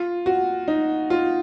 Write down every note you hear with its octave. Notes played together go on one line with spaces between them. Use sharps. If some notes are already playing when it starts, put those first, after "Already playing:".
Already playing: F4
F#4
D#4
F4